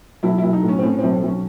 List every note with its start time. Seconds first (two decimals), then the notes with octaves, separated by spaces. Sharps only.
0.23 B1 E4
0.38 E4
0.43 B1
0.53 D#4
0.63 A2
0.68 C#4
0.79 C4
0.83 A2 C#4
0.99 B1 C4
1.13 C4
1.23 B1
1.28 C#4